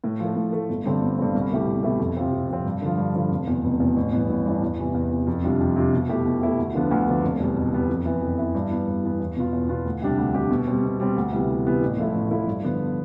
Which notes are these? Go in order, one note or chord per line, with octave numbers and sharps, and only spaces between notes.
A2
F3 A3
A2
F3 A3
G1
G2 D3 A3 C4
G1
G2 D3 A3 C4
C2
B2 A3 E4 G4
C2
B2 A3 E4 G4
F2
C3 F3 C4
F2
C3 F3 C4
G2
D3 F3
G2
D3 F3
F1
E2 B2
F1
E2 B2
A1
G2 E3 B3
A1
G2 E3 B3
E2
C3 E3
E2
C3 E3
F2
C3 G3 D4 F4
F2
C3 G3 D4 F4
B2
A3 E4 G4
B2
A3 E4 G4
D2
D3 F3 B3 D4
D2
D3 F3 B3 D4
F1
E2 B2 G3 B3
F1
E2 B2 G3 B3
F2
E3 B3 E4
F2
E3 B3 E4
G2
E3 B3
G2
E3 B3
E2
B2 B3 F4
E2
B2 B3 F4
D2
C3 G3 D4 G4
D2
C3 G3 D4 G4
B2
G3 C4
B2
G3 C4
D2
C3 E3 G3 B3
D2
C3 E3 G3 B3
A1
A2 F3 A3 E4
A1
A2 F3 A3 E4
G2
D3 F3 B3